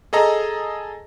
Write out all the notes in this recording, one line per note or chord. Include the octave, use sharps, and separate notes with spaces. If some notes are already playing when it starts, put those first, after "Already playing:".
G#4 A4 D#5 A#5